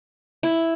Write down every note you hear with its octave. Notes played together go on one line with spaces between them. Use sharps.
E4